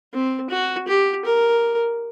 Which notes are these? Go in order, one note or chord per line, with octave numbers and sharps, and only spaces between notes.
C4
F#4
G4
A#4